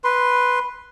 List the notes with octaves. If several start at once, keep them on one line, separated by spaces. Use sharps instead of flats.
B4 C6